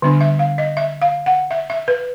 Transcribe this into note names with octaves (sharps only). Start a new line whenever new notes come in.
D3 G3 B3 D4
E5
F5
D#5
E5
F5
F#5
E5
E5
B4